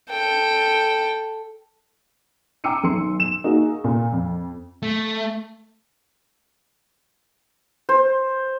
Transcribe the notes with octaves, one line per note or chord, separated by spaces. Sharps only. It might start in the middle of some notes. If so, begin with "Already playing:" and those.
A4 G5
G5 A#5 D6 E6 C#7 D#7
B1 D#3 C6 C#7
E7
A#3 D#4 F#4 G#4
A#2
F2
A3
C5